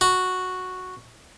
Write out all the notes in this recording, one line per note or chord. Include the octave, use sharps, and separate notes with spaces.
F#4